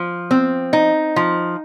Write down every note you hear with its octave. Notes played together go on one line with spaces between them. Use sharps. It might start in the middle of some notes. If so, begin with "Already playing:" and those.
Already playing: F3
C4
D#4
F3